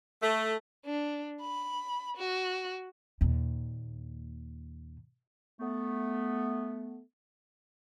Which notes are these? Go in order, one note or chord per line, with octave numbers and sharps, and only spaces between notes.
A3
D4
B5
F#4
D#2 A#2
A3 B3